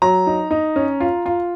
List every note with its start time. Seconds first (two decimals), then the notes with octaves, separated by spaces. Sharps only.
0.02 F#3 A#5
0.27 D#4
0.51 D#4
0.76 C#4
1.00 F4
1.26 F4